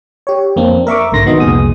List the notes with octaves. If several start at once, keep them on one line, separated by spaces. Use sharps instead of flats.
G4 C#5
F2 A#3 C4 D4
A#4 E5 C#6 D6
B1 G#2 D3 C6 A#6
D#3 B3 F#4 D#5
C2 F2 A#2 G#4 D#6